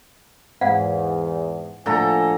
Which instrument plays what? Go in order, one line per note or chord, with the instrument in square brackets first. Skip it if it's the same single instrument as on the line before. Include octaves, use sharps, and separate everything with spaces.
[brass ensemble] E2 [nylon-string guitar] G#2 [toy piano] F5 F#5
[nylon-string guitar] A2 A#3 [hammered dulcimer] D3 A4 A#5 [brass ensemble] F3 G#5